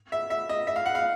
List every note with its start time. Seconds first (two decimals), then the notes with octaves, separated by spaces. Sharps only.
0.12 E5
0.30 E5
0.49 D#5
0.67 E5
0.76 F5
0.86 F#5
0.95 F5